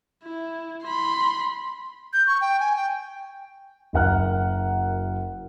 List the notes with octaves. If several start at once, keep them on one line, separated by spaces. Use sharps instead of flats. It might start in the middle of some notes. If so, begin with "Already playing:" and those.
E4
B5 C6
G6
C#6
G5
G#5
G5
F#1 F#2 A#4 F#5 F6 F#6